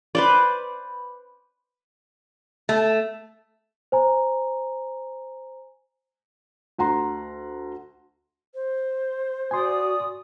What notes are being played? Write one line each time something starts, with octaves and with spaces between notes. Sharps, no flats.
B4 C5 D5
A3
C5 G#5 A#5
D2 F#5 A#5 C6
C5
F#4 D5 G#5 C6 D#6